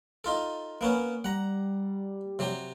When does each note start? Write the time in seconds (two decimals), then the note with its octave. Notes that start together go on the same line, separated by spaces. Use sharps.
0.24 D#4 F4 A4
0.81 A#3 B3 C#4
1.24 G3 F#5 A#5
2.39 C3 F#3 G4